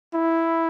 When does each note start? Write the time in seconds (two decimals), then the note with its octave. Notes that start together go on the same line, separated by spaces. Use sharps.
0.15 E4